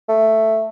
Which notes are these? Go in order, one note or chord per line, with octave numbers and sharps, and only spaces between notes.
A3